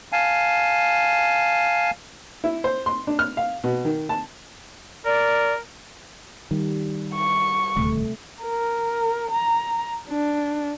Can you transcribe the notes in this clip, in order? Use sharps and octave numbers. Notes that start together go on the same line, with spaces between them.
F5 G#5 A5
E4
C5
C6
D4
F6
F5
B2
D#3
A5
A#4 D5
D#3 G3
C#6
D#1 D2 C3 A3
A#4
A#5
D4